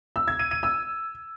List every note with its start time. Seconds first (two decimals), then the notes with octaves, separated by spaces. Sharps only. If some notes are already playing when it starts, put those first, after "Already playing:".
0.16 E6
0.28 G#6
0.39 D#7
0.51 D#7
0.63 E6